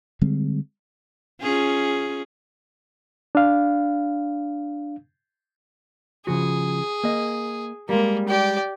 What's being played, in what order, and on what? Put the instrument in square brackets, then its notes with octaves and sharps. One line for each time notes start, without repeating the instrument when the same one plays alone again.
[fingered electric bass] D3 G3 G#3 C4
[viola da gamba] C#4 F4 G#4
[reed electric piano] D4 F5
[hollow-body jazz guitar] C#3 F3 F#4 [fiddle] G#4
[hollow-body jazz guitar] A#3 D#5
[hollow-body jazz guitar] G3 G#3 [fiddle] A#3
[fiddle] G4 D5